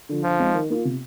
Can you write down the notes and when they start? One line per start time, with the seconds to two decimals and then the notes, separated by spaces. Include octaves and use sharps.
0.09 D3 F3
0.24 D3 F3
0.39 G#3 C4 D#4
0.54 D#3
0.70 A#3 F4
0.85 C3